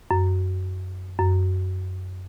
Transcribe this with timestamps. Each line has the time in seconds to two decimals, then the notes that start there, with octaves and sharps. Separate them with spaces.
0.11 F#2
1.20 F#2